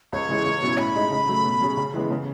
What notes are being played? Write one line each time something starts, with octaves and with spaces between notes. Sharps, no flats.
C#2 C#5
C#3 E3 G#3
C#2
B2 F#3 C#4 E4
A2 B5
G#3 D#4
C#3
F#3 A3
B2
F#3 C#4 G#4
C#3
E3 G#3 B3
C#3